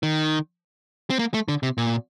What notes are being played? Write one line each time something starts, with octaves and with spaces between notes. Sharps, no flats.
D#3
C4
A#3
A3
D3
C3
A#2